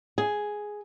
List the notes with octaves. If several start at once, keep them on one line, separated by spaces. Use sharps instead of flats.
G#4